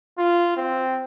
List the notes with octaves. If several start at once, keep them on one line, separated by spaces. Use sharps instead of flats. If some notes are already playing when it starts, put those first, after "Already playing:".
F4
C4